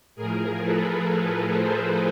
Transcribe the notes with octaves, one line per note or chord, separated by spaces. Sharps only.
A2 F3 G#4 A#4
A4 B4
A#4 C5